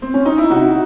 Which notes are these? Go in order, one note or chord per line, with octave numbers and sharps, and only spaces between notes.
C4
C#4
D#4
E4
C3 D#4 F#4